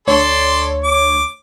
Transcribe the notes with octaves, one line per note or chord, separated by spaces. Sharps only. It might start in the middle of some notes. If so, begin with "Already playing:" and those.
D2 A4 C#5 D5 C6
D6